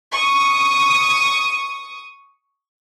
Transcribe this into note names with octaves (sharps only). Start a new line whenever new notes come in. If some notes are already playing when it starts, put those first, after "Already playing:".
C#6 D#6